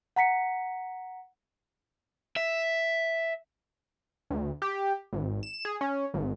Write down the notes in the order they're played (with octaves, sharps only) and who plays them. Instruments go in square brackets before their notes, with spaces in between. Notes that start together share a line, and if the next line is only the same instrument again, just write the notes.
[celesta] F#5 A#5 B6 C#7
[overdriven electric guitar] E5
[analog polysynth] D2
G4
G#1
E7
G#4
C#4
G#1